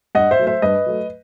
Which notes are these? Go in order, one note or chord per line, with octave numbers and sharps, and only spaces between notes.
G2 D#5 F#5
C5 E5
F#3 A3
C5 E5
G2 B4 D#5
F#3 A3